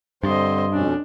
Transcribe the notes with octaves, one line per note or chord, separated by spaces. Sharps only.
G2 D3 C4 C5 D#5
F2 B2 C#4 D4